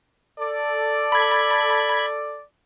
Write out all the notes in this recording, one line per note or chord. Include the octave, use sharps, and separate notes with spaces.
A4 D5
B5 G#6